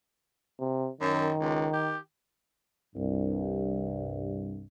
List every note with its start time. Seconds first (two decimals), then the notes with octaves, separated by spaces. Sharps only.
0.60 C3
1.01 F#2 D#3
1.41 C#2
1.73 G4
2.96 C2 G2